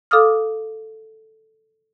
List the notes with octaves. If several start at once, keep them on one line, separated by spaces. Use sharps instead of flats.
A4 F5 D6 D#6 F6